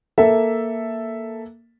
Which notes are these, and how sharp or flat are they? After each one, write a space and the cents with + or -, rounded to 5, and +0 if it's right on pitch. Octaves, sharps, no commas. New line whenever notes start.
A#3 +0 A4 +0 E5 +0